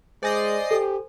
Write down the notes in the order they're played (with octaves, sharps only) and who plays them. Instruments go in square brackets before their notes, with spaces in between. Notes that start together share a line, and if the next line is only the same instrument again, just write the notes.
[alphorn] G#3 [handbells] C5 G#5 G6 [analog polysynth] D5 D#5 C7
[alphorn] G4 [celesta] A4